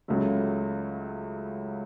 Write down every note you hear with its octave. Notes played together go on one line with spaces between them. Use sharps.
C#2 C#3 F#3 A3